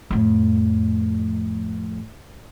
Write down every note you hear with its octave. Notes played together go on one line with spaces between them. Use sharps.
F2 A2